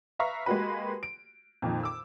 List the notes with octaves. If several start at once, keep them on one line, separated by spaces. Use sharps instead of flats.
B4 E5 F5 A#5 C#6
G#3 A#3 F#4 G4 B4
D7
F2 A#2 D#3
D6 E6